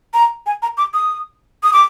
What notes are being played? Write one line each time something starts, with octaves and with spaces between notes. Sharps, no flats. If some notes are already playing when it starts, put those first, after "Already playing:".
A#5
G#5
A#5
D6
D#6
D#6
D6